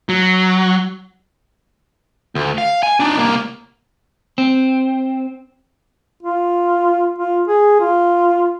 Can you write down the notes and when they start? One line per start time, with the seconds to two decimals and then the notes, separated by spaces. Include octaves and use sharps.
0.09 F#3
2.35 D2
2.58 F5
2.83 G#5
3.00 D4 D#4
3.17 C2 A#3
4.38 C4
6.23 F4
7.18 F4
7.48 G#4
7.80 F4